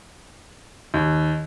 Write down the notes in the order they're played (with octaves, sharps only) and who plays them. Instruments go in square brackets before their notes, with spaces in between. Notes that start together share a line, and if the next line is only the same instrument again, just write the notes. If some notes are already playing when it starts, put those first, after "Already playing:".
[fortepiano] D#2